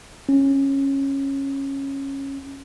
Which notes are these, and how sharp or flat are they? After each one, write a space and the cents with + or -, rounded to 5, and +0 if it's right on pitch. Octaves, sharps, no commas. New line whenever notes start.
C#4 -15